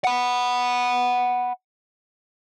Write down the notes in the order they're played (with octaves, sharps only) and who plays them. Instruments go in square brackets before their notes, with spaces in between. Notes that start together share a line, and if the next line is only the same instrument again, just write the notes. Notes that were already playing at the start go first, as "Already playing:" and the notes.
[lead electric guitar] F#5 B5